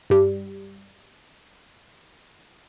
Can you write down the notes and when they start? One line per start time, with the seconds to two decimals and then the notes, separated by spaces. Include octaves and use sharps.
0.10 G2 G3